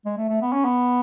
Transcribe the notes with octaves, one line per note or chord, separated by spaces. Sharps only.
G#3
A3
A3
B3
C#4
B3